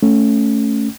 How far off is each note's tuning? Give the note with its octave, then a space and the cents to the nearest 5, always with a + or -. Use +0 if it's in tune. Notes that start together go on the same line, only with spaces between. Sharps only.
A3 +0 C#4 +0